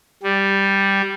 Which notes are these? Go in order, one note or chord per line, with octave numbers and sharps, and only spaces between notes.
G3